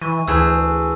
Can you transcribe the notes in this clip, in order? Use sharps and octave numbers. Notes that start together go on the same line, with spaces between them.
E3 C#6 D#7
D2 E3 G#4 C5 G#5 A5 E6